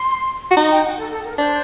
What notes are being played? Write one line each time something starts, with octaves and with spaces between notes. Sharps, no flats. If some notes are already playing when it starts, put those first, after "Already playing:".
Already playing: C6
F#4
D#4 A#5
G5
F#5
A4
A4
A#4
D4 C5